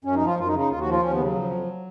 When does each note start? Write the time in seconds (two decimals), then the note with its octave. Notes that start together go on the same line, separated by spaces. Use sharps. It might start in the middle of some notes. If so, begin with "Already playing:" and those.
0.05 F#2 C#4
0.16 D#4
0.21 F3
0.27 F4
0.37 F#2 F4
0.48 D#4
0.53 C#3
0.59 D#4
0.70 D#2 F4
0.80 F#4
0.86 F3
0.92 F4
1.02 D#2 C#4
1.13 B3
1.18 C#3
1.24 F#3
1.35 F3
1.51 F2